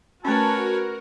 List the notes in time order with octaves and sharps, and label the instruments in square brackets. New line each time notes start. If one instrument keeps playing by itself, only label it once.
[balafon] A3 C#4 [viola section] F#4 A#4 [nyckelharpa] B4 C#5 [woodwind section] G#5 A5